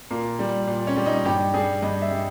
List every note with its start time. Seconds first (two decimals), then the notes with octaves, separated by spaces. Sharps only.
0.11 A#2 A#3
0.39 G3
0.67 A#2
0.87 C#4
0.96 G3
1.06 D#4
1.25 G2 G4
1.54 G3 G#4
1.82 G2 D#5
2.02 E5
2.12 G3